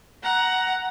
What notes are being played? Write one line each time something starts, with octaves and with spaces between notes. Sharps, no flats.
F#5 A#5